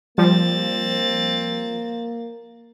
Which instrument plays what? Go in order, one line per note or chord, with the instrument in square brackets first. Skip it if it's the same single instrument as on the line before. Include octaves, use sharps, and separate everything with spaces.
[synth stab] F3 G3 [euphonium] A#3 [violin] C4 A6